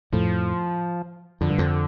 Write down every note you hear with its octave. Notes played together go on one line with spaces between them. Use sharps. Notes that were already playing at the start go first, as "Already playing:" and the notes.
F2 A2 F3
F2 D3
G2
F2